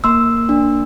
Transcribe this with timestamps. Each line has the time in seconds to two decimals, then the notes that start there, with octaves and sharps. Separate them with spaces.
0.04 A#3 C6 E6
0.49 D4